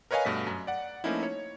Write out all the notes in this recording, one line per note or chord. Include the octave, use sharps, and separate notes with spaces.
A#4 B4 C#5 D#5 F5 G#5
G2 B2 A3 B6
F#2
D5 F#5
F3 A3 A#3 C#4 D#4 E4
C#5